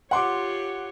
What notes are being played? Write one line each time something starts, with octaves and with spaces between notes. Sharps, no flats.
F4 G4 C#5 F#5 C6 D6